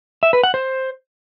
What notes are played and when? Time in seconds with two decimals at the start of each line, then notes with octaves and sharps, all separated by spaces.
0.23 E5
0.33 B4
0.43 F#5
0.54 C5